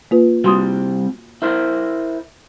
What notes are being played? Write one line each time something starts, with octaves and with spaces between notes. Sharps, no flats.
A#3 F4 B4
C2 G3 C4 F#4 C6 D#6
E4 A#4 C5